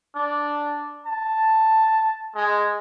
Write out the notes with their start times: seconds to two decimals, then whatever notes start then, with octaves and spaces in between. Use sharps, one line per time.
0.15 D4
1.06 A5
2.35 G#3